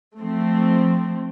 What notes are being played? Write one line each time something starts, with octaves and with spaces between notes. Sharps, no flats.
F3 A3 C4